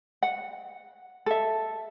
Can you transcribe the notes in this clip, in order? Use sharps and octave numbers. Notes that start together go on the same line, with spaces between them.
F#5
A4 E5